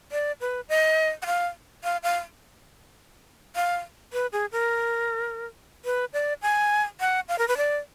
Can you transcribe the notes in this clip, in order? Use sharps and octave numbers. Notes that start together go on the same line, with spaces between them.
D5
B4
D#5
F#5
F5
F5
F5
F5
B4
G#4
A#4
B4
D5
G#5
F#5
F5
A#4
B4
D5